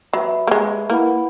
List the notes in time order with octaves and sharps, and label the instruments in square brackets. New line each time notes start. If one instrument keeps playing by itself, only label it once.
[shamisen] F#3 [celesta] B4 E5 B5
[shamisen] A#3
G#3
[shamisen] A#3 [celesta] E4 B4 F#5 B5